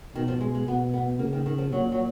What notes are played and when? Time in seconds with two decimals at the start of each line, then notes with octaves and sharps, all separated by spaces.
0.15 B2 D#3
0.28 F3
0.40 G#3
0.55 G#3
0.68 B2 B3
0.94 B3
1.19 C#3 A#3
1.33 D#3
1.46 D#3
1.58 F3
1.72 A#2 F#3
1.92 F#3